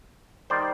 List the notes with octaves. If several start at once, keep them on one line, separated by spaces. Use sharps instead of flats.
D#3 G3 C5 D5